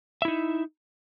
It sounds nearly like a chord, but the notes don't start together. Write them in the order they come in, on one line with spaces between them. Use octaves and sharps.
E5 E4 D#4